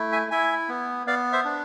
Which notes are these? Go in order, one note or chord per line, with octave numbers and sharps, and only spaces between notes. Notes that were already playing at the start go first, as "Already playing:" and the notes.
Already playing: A3 E4
E5 G#5
E4 E5 G#5
B3
B3 D5 F5
C5 E5
D4